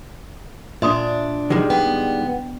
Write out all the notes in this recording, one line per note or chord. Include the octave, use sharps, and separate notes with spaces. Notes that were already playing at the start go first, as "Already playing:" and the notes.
A#2 D4 E5 C6 D#6
D#3 G3 G#3
B3 G5